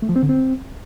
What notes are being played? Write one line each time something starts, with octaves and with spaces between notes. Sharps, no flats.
A3
F3
C4
D3
C4